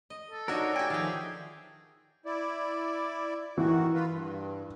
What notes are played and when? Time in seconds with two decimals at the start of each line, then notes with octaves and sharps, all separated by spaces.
0.10 D#5
0.31 A4
0.48 D4 D#4 F#4 A#4 C#5 D#5
0.76 F#4 G4 G5 G#5
0.90 D#3 F3 G#4 E5 F5 G5
2.26 E4 D5
3.58 D#3 E3 F#4
3.94 F4 B4
4.10 G2